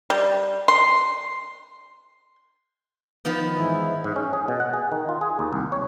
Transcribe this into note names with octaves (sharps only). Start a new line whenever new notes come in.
G3
C6
D#3 F3 B3
G#2 E3 E4
G#2
C#4
G#4
B2
F#5
G#4
D#3
F4
G#4
D#2
C2
C#5